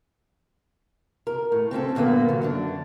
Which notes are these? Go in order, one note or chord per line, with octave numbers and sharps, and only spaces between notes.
A#4
A2
C4 C#4 F4 A4
G2 A#2 D3 A#3 B3
F3 F#3
F#2 D3 D4